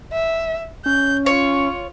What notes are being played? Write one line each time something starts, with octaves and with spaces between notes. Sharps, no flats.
E5
C#4 G6
F4 C#5